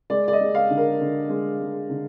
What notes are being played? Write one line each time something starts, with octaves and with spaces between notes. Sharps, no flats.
G#3 D5
D5
D#5
G#3
F5
D3
A#4
D3
G#3
G#3
D3